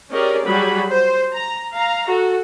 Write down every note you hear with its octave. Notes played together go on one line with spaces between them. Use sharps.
C#4 G4 G#4 A#4 D5 D#5
F#3 G3 F#4 G#4 B5
C5
A#5
F5 A#5
F#4 A4